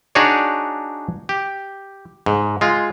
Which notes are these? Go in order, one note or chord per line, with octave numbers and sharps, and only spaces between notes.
D4 D#4 F#4 G#4 C#5 D5
G4
G#2
G#3 F4